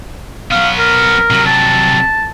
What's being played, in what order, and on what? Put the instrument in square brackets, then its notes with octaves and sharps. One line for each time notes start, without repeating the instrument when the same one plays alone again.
[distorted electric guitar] F#3 B3 [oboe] F5
[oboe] A#4
[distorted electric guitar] C3 F#3
[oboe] A5